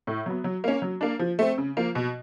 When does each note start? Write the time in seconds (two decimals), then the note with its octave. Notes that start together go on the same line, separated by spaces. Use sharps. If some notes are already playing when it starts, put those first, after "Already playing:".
0.07 A2
0.26 F#3 B3
0.44 F#3
0.64 A#3 C#4
0.82 F#3
1.01 A#3 D4
1.19 F3
1.39 A3 C4
1.58 C#3
1.77 F3 A#3
1.95 B2